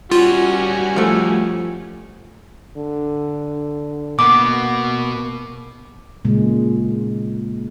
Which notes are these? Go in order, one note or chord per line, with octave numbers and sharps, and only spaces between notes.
G3 C#4 F4 F#4 G#5
F3 A3
D3
B2 A#3 B3 D6
A#2 C#3 G#3